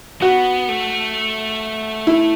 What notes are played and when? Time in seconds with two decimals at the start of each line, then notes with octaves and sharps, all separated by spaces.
0.22 B3 F#4
0.69 A3
2.07 E4